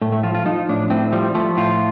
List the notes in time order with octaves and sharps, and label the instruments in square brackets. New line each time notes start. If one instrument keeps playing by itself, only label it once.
[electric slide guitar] A2 A3
A3
F3 F4
F4
F3 D#4
A2 D4
A2 C4
F3 G3
F3 A3
A2 F4